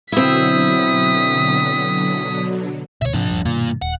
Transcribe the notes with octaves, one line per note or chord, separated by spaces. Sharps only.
B2 D3 F#3 C4 E4 D#6 B6
D2 B2 C#5 E5
G#2 C3 F3 C4 D4
D#1 G2
G2 B2 D#3 A#3 F4
D#1 F#5